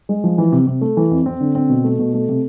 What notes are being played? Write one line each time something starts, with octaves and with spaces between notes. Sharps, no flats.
G#3
F3
E3
C3
C3
A3
E3
F2
C4
D3
C4
B2
A3
B2
A3
C3